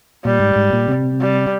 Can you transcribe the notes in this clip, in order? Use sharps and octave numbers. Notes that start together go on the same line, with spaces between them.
A#2 G3
G#2
G#2
A#2
C3
G3